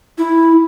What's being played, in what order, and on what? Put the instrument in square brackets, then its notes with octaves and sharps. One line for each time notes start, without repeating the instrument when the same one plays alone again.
[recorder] E4